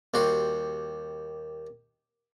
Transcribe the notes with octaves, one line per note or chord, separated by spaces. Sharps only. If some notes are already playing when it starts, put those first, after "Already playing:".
D#2 G3 F#4 C6